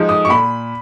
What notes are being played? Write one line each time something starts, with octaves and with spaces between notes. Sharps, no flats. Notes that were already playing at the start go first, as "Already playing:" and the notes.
Already playing: F3 G#3 D#4
D#6
C#6
A#2 B5